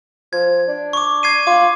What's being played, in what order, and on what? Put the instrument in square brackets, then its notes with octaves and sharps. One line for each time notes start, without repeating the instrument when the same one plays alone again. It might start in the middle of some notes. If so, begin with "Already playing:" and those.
[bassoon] F3 [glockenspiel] G#6
[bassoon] D4
[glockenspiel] C#6 D6
G#6 C7 D#7
[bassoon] F4 [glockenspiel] D6